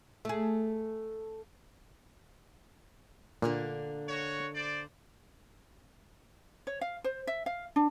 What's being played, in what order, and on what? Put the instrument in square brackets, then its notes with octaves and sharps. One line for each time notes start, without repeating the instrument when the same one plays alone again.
[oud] A3 G#4
[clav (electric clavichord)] A#2 [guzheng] D3 A#3 D4
[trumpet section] F#4 C#5
C5 D5
[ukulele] C#5
F5
C5
E5
F5
D4